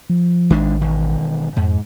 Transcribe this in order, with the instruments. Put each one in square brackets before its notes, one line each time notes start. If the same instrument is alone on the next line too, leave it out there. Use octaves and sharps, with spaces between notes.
[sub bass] F3
[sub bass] A1 [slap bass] D#3 G#3 D4
[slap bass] E1 D#3
[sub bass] F2 [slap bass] G#2